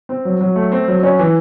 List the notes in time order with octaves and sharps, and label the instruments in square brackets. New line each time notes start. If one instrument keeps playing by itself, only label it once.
[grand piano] C4
F#3
F#3
A3
C4
F#3
C#4
E3